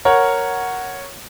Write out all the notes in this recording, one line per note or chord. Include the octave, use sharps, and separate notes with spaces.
A#4 C#5 F#5